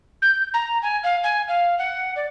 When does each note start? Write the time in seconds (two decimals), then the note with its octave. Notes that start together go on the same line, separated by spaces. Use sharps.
0.22 G6
0.54 A#5
0.82 G#5
1.04 F5
1.24 G#5
1.48 F5
1.78 F#5
2.16 D5